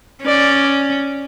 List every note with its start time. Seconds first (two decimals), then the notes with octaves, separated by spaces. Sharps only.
0.24 C#4 D5